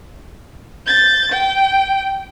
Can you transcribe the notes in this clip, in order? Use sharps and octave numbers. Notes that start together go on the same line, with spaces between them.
G6 A6
G5